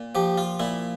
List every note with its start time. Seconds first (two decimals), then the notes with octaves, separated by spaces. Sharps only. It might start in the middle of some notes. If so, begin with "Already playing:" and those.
Already playing: A#2
0.15 F3 G4
0.38 F4
0.60 A#2 E4